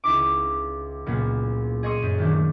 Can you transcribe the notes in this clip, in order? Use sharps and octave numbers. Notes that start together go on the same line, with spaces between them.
C#2 D#4 E4 D6
C#2 A#2 F#3 A#3 B3
G#4 D#5 C6 C#6 D#6
F#2
D#3 E3 F#3 A3 D4